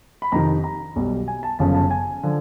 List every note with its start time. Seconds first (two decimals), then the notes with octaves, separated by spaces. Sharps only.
0.22 B5
0.32 F2 C3 D#3 A#5
0.64 A#5
0.96 B1 B2 G3
1.28 G#5
1.43 A5
1.59 G1 F#2 C#3 F3 A5
1.75 A5
1.90 G#5
2.23 D3 F3